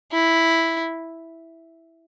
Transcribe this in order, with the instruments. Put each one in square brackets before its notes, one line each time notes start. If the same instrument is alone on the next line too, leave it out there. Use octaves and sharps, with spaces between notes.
[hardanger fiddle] E4